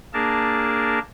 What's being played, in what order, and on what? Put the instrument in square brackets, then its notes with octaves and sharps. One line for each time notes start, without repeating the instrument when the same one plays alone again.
[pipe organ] A#3 D4 G#4 A#4 A5